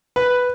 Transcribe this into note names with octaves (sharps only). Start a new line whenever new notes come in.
B4